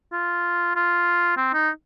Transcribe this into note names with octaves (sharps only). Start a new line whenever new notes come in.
F4
F4
C4
D#4